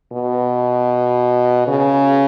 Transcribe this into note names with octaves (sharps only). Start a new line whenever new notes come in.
B2
C#3